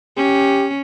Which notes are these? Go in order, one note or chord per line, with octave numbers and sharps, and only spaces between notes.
C#4 G4